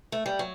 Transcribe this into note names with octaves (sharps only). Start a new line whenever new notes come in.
A3
G3
F#3